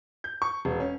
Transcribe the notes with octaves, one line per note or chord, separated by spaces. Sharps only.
G6
C#6
E1
C#4